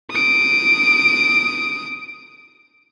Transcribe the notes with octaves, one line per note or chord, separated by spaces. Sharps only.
D#6 D7